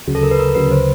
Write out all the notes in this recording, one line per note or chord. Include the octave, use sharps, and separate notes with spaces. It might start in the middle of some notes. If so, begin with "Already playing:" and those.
D2 C#3 F#3
A4
A#4
B4
A#4
D2 C#3 F#3 B4
C5